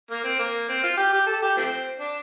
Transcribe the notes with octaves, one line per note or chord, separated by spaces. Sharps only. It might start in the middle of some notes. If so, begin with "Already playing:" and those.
A#3
C4
A#3
C4
F4
G4
G4
A4
G4
F3 A3 C4
D4